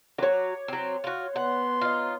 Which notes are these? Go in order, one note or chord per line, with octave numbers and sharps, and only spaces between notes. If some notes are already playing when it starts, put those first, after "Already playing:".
F#3 F#4 C#5 D6
F#3 C4
F4 F#4
B3 F#5 C6
D#4 F4